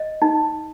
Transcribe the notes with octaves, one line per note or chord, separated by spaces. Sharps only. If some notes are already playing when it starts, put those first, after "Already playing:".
Already playing: D#5
D#4